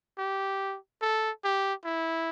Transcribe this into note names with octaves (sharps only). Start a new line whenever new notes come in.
G4
A4
G4
E4